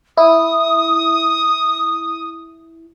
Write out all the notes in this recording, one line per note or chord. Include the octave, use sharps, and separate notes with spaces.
E4 D#6